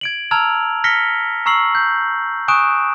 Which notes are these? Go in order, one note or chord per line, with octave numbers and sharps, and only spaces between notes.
G#6 D7 F#7
A5 A#5 E6 F6 G#6 F7
F6 A#6 B6 C#7 G7
A#5 C#6 E6 C7 F#7
G6
G#5 C#6 D#6 F#6 D7 E7